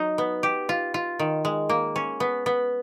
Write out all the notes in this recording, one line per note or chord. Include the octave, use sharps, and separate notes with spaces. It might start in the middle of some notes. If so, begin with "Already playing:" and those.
Already playing: F#3 D#4
B3
G4
F4
F4
D#3
G#3
A#3
C#4
B3
B3